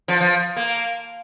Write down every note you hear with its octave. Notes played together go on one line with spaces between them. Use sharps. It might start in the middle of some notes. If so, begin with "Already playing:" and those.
F3
F3
A#3